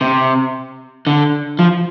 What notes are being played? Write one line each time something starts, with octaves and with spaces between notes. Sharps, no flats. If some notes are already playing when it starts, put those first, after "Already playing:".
C3
D3
F3